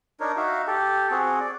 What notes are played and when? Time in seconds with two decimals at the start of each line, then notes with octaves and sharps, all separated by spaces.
0.20 D4 D#4 A#4 C#5
0.36 D#4 F#4 E5 F5
0.67 G4 A4
1.11 C4 F#4 G#4
1.40 D5